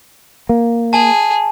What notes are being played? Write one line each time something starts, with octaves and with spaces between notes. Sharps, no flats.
A#3
G#4 G#5 A5